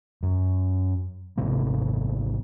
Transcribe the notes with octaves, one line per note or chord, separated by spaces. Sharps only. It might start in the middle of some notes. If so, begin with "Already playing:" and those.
F#2
G#1 C3 A#3 B3